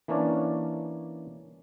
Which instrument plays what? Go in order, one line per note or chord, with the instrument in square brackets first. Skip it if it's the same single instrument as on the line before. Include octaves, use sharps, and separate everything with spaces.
[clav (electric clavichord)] E3 A#3 C#4 D4 C#5 D5